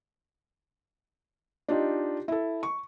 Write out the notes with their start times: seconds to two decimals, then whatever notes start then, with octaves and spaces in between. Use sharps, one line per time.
1.68 D4 D#4 F4 G4
2.28 E4 A4
2.63 C#6